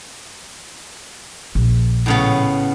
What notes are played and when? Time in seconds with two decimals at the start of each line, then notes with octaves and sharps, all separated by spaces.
1.55 A#1
2.06 A2 C#3 B3